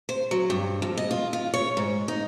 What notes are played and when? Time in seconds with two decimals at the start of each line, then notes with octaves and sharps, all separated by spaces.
0.09 C5
0.31 F#3
0.50 G2
0.82 F2
0.98 D#5
1.11 F4
1.33 F4
1.54 C#5
1.77 G#2
2.08 D#4